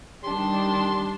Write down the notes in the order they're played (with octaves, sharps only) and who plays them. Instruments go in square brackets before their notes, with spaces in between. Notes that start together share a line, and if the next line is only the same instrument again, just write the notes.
[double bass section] D#3 G3 [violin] D4 [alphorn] G4 [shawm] C6